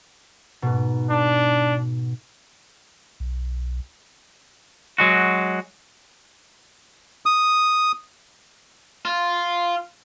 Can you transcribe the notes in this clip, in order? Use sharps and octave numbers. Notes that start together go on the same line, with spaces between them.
G#2 B2
D4
B1
F#3 G#3 F#4
D#6
F4